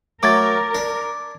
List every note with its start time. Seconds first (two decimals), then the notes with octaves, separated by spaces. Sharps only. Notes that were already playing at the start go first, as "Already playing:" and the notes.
0.23 F#3 A3 A#4 D6 G#6 A6
0.75 D4